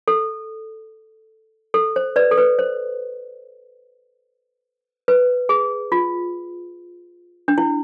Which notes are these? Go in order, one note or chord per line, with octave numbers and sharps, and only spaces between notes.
A4
A4
C5
B4 D5
A4
B4
C5
B4
G#4
F4
D4
E4